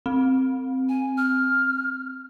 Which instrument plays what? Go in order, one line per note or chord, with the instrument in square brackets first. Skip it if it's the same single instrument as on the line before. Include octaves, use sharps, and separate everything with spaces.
[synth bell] C4
[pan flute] G#5
F6